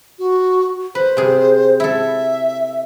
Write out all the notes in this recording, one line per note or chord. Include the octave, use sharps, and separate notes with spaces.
F#4
B4 C5
C3 G#4
E4 A4 E5